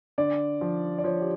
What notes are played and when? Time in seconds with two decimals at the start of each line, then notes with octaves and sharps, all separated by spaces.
0.18 D3 D5
0.61 F3
0.98 D5
1.04 F3 C#5
1.20 G4